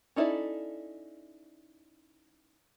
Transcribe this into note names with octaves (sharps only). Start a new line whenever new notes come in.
C#4 D#4 E4 A4 D5